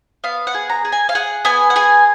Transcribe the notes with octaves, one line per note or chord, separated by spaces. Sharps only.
B3 F5
F#5
G#4
A#5
G#4
G#5
F5
G#4 F#5
B3 G#5
F#5
G#4 G#5